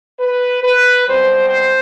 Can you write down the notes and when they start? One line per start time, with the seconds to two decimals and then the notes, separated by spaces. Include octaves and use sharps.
0.19 B4
0.63 B4
1.07 B2 G3 C4 C5
1.50 C5